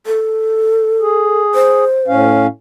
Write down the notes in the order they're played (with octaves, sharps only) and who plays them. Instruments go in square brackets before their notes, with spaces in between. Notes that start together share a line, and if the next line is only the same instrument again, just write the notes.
[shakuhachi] A4
[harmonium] G#4
[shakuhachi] C5
[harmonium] A2 C#4 F5